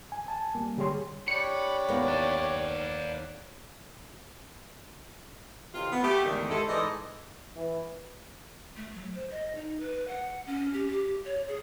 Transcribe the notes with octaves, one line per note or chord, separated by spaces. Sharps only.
G#5
G#5 A5
G3 A#3
D3 G3 G4 G#4 C#5 C6
D4 G4 C#5 B5 C#7
D#2 B3
B4 D5
A2 C3 D#3 F4
B3
A3 G4
E2 G#2 D3 D#3
G#3 A3 E4 G4 A4
G#2 E3 D#4 A4 D5 D#5
E3
A3
F#3
C5
D#5
D#4
B4
F#5
C#4
G4
G4
C#5
G#4